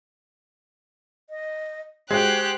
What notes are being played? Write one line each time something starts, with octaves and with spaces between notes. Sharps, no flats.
D#5
G#3 F#4 G4 C5 F#6